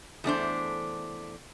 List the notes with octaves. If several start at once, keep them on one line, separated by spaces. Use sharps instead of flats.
E2 A3 D4 C5